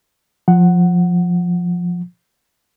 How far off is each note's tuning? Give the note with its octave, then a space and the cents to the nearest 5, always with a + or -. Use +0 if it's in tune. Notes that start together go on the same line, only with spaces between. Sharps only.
F3 +10 F#5 +0